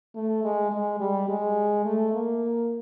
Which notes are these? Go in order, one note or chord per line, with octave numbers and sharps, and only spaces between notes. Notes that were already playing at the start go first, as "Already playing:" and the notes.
A3
G#3
G#3
G3
G#3
A3
A#3